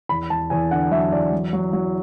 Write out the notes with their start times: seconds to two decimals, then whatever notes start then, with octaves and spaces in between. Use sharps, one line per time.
0.09 E2 B5
0.30 E2 A5
0.50 E2 G#5
0.71 D3 F#5
0.91 F#3 E5
1.12 E2 D5
1.32 F#3
1.53 F#3
1.73 F#3